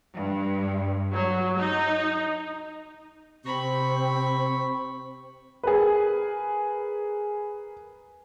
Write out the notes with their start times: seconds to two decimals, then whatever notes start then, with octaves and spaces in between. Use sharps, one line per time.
0.13 G2
1.13 F#3
1.58 D#4
3.45 C3 C4 B5 C#6
5.63 G#4 A#4 B4